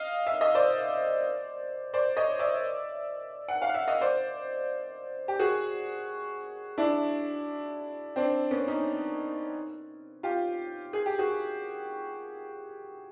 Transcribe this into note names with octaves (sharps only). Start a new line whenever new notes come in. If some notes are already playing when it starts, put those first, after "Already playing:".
Already playing: D#5 F5
E5
D#5
C5 D5
C5 D5
C#5 D#5
D5 E5
F#5
F5
E5
D#5
C5 D5
G4
F#4 G#4
D4 E4
C4 D4
B3 C#4
C#4 D#4
F4 G4
G#4
G4
F#4 G#4